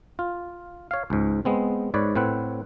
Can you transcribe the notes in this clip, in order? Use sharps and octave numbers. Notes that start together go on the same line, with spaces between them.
F4
C#5 F5
C#2 G#2
G#3 B3 C4
G#2 B4 C#5 D5
A2 C4 B4 F#5